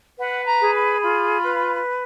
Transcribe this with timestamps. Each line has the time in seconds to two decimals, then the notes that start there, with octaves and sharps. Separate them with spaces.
0.19 B4 F#5
0.46 A#5
0.60 G#4
0.73 B5
1.01 F4 B5
1.43 B4